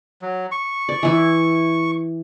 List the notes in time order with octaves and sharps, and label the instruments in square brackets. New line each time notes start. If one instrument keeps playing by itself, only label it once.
[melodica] F#3
C#6
[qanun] D5
E3 E4